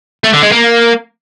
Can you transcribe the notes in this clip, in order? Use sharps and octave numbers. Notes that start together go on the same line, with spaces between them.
A3
D3
G#3
A#3